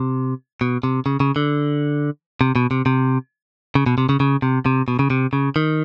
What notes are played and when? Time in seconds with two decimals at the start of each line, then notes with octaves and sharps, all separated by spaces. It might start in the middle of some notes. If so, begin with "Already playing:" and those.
Already playing: C3
0.61 B2
0.83 C3
1.06 C#3
1.20 C#3
1.36 D3
2.41 C3
2.56 B2
2.71 C3
2.86 C3
3.75 C#3
3.86 B2
3.98 C3
4.09 C#3
4.20 C#3
4.42 C3
4.66 C3
4.88 B2
4.99 C#3
5.10 C3
5.33 C#3
5.56 D#3